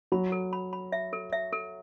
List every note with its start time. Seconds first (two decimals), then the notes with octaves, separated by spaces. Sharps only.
0.12 F#3 B5
0.32 A4
0.53 B5
0.73 B5
0.92 E5
1.13 A4
1.32 E5
1.53 A4